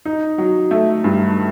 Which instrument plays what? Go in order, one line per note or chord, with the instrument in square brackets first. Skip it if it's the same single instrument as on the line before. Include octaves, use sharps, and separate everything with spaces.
[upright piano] D#4
F#3
A3
G2